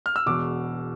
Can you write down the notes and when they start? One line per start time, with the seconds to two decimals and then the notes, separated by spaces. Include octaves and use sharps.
0.06 F6
0.16 E6
0.26 E1 E2 B2 D6